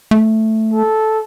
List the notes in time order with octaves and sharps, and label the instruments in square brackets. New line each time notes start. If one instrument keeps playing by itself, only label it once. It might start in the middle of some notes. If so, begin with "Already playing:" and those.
[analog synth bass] A3
[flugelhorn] A4